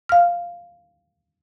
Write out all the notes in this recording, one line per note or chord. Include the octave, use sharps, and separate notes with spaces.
F5 F6